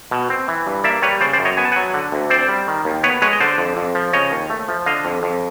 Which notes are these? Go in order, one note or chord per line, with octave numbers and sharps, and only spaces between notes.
B2
C4
E3
G2
A#3 D5 E5
G3 B4 C#5
C#3 C5 D5
C5 D5
F#2
C#5 D#5
B3 G#5
A5
F#3 F#5 G#5
D3
D2
C4 C5 D5
G3
D#3
D#2
B3 B4 C#5
G#3 B4 C#5
D#5
D3 C5 D5
F2
F2
F3
C#3 C#5 D#5
D#2
A3
F3
D3 D#5 F5
F2
F2